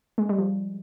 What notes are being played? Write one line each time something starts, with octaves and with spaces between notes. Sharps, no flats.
G#3
G3
F3